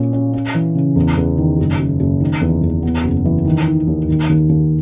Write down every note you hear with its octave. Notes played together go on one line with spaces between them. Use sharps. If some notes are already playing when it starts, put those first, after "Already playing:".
Already playing: A#2 C#4
C#4
C#4
E3
C#3
E2
E2
D#3
F#1
F#1
F#1
D#3
E2
E2
B3
F#1
E3
D#3
D#4
D#2
D#3
D#2
D#2